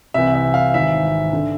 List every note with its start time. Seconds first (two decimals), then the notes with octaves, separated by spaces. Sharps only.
0.14 C2 C3 E3 E5
0.34 E5
0.54 F5
0.74 G#1 G#2 E3 E5
1.33 D3